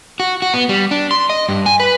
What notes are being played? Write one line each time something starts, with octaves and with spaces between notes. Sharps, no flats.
F#4
F#4
B3
G3
D4
C6
D#5
G2
G#5
B4